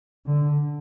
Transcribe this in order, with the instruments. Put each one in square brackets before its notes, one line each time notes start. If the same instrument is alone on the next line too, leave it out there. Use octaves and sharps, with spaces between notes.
[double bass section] D3